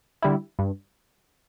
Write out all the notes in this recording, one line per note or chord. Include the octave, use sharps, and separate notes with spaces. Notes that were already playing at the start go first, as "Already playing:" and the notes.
D3 G3 E4
G2